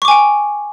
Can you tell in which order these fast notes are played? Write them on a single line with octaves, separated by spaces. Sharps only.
C#6 D6 G#5 G5